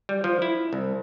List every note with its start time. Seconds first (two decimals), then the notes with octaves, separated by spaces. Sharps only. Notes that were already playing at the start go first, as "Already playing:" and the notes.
0.09 G3
0.24 F3
0.42 E4
0.73 C2